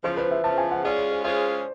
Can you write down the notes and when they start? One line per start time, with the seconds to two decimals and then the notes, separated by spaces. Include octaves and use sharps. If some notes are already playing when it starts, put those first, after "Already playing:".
0.04 E2 C#3 F3 C5
0.17 B4
0.31 E5
0.44 E2 C#3 F3 A5
0.58 G#5
0.71 F#5
0.84 G#3 C#4 F4 G#4 D5
0.98 C#5
1.11 C5
1.24 G#3 C#4 F4 G#4 C5